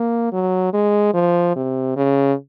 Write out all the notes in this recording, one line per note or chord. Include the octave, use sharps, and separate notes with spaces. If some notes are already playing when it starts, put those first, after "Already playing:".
Already playing: A#3
F#3
G#3
F3
C3
C#3